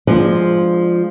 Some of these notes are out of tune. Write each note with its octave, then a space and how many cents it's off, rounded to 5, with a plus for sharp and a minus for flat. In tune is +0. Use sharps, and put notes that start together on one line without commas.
F3 +0 G#3 +0 D4 +25